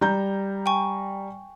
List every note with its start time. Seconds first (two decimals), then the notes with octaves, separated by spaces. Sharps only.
0.01 G3 A#5 G6
0.66 G5 G#5 C#6